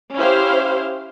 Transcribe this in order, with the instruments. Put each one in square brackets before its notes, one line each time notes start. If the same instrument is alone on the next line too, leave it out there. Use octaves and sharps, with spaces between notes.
[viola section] C#4 E4 G4 C5 F5